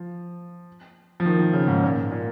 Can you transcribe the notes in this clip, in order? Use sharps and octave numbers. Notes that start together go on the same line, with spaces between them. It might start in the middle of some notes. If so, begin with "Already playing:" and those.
Already playing: F3
F3
D#3
D#3
C#3
G#2
A#2
A#2